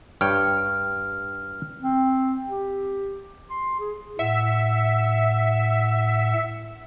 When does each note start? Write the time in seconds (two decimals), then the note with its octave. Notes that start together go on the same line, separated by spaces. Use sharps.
0.21 G2 C#5 G5 F6
1.82 C4
2.48 G4
3.50 C6
3.79 G#4
4.19 A2 E5 F#5